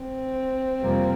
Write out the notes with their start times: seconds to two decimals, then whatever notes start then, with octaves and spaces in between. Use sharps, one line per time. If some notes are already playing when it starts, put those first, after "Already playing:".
Already playing: C4
0.80 F2 C3 G3 A#3